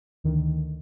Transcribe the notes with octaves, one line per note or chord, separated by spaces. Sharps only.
D2 D3 D#3